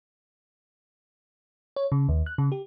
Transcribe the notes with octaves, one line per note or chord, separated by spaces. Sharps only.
C#5
C#3
D#2
F#6
C#3
G4